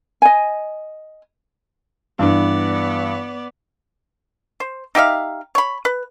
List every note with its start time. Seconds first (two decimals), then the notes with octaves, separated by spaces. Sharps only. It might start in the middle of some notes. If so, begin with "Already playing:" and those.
0.22 D#5 G#5
2.19 G2 E3 B3 D5
4.60 C5
4.95 D#4 G4 E5 F5
5.55 C#5 B5
5.85 B4